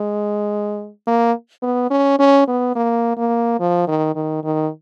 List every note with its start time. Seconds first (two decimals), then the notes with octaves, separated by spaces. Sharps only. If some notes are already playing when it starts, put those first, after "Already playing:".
Already playing: G#3
1.07 A#3
1.62 B3
1.90 C#4
2.19 C#4
2.48 B3
2.76 A#3
3.17 A#3
3.60 F3
3.88 D#3
4.15 D#3
4.44 D#3